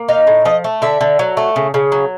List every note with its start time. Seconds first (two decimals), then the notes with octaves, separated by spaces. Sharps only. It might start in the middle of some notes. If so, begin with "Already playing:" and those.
Already playing: A#3
0.09 D#4 F5
0.27 A2
0.45 F3 D#5
0.64 A3
0.82 D3 E5
1.01 D3
1.19 F#3
1.37 A3
1.56 C#3
1.74 C#3
1.92 F#3